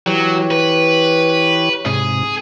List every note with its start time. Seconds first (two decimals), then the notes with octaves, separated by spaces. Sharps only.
0.06 E3 F#3 G4 C#5
0.51 B4
1.86 G#2 C3 G#4